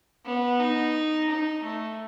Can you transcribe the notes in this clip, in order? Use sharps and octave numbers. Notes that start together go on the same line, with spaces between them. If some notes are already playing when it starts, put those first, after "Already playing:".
B3
D#4
D#4
A3